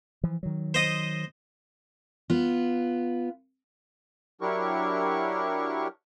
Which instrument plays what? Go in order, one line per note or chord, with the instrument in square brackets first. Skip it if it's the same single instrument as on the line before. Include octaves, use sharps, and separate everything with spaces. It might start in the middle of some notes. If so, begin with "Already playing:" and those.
[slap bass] E3 F3
D#3 F#3
[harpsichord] C5 D#5 D#6
[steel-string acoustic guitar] B3 F4
[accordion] F#3 D4 E4 G4 A#4 C#6